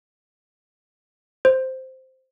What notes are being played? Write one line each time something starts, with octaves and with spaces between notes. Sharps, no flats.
C5